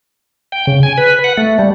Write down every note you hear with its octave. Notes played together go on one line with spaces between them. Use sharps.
G5
C#3
G#5
B4
F#5
A3
G3